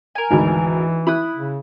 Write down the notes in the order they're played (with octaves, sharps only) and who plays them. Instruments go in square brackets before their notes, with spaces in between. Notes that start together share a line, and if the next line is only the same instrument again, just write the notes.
[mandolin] A#4 G#5
[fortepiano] G#1 D2 B5 [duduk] E3
[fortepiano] E4 [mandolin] B5 D#6 F#6
[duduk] C#3